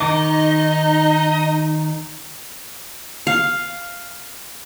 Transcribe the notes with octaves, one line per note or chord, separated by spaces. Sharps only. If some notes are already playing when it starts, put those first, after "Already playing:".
D#3 D#4 D#5 D6
F5